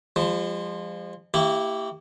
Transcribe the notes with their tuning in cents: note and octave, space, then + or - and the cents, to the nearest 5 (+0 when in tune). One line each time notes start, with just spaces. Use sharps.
F3 +0 G#3 -40
A#3 -45 E4 -10 G4 +0